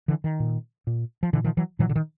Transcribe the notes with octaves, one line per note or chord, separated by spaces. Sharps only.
D3 E3
D#3
A#2
A#2
F3
A#2 D3 E3
D#3 F3
E3 F#3
A#2 E3 F#3
D3
D#3